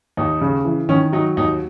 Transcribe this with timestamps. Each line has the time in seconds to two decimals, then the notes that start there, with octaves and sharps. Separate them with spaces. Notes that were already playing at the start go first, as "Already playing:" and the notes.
0.17 D#2 D#4
0.41 C#3
0.65 E3
0.89 D#3 C#4
1.12 F#3 D#4
1.37 D#2 D#4